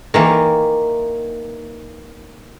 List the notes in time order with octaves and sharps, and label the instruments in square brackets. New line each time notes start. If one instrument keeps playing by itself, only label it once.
[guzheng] D#3 E3 A#3